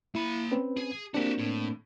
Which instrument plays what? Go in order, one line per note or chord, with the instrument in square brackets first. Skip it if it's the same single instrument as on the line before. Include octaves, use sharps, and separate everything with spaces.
[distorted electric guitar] A#3 B5 [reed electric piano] E4
[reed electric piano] C4 C#4 B4
[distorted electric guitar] G#4
[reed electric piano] A#3 C4 D4 [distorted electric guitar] F#4 G4
[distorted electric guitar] A2